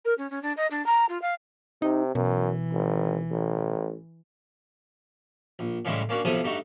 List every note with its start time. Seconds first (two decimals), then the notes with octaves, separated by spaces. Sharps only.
0.05 A#4
0.18 C#4
0.30 C#4
0.42 D4
0.57 D#5
0.71 D4
0.86 A#5
1.09 F4
1.22 F5
1.82 C3 D#4
2.15 F#2 B2 E3
2.73 G#1
3.31 A1
5.59 A#1
5.85 A2 C#3 E3 G3 G#3
6.09 A#3 C#4 D4 F#4
6.25 B1 C3 F3 E4 A4 D#6
6.44 G2 A3 D#4 F#4